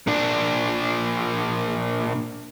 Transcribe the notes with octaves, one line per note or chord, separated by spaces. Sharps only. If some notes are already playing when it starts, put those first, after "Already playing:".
A#2 D4